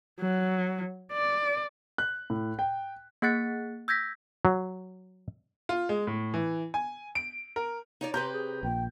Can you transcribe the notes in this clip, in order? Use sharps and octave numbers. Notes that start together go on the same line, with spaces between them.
F#3
D5
F#6
A2
G5
A#3 G#4 F#5 F#6 A6 C#7
E6 G6 G#6 A#6 B6
F#3
F4
G#3
A2
E3
G#5
D7
A#4
D#4 C#5 D5
C3 G4 B4 A#5 C6 G6
G#4
A#1 A#2 G5